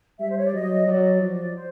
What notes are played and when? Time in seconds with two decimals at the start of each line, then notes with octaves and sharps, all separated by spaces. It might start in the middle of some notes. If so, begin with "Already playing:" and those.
0.19 G3 E5
0.31 C5
0.37 C#5
0.46 D5
0.53 F#3 D#5
0.87 F#3 D5
1.22 F3
1.55 C5